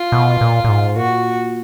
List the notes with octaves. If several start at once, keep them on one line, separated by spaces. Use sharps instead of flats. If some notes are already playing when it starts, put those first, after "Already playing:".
Already playing: F4
B2
A#2
A#2
G#2
A#2 F#4